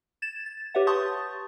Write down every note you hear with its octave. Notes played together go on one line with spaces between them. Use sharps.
G#6 A6 E7
A6
G4 B4 C#5 E5 F#5
A5 C6 C#6 D#6 G6 A6